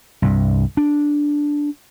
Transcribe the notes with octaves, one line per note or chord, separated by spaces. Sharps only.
C2 G2
D4